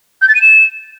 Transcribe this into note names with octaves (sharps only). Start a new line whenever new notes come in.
G6
A6
D#7
E7